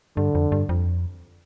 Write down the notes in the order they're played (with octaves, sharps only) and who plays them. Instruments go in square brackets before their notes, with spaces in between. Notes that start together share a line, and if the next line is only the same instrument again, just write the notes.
[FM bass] G2 [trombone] D3
[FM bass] F2
G2
F2